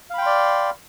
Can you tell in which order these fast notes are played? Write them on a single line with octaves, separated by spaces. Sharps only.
F5 B5 G5 C6 D5